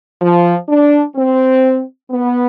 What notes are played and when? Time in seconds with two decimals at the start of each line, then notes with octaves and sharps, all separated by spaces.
0.22 F3
0.69 D4
1.16 C4
2.11 B3